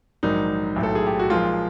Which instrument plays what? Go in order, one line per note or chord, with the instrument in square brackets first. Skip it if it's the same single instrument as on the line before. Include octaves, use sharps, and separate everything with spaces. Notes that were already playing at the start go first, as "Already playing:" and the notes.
[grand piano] A#1 G#2 D#3 F#3 D#4
B1 A2 F#3
A4
G#4
G4
F#4
B1 A#2 F3 G#3 F4